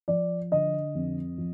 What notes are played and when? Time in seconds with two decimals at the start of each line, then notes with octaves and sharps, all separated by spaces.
0.08 F3 D5
0.52 D3 D#5
0.95 F2
1.38 F3